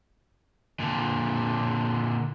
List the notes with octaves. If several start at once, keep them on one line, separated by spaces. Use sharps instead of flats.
A#2 D3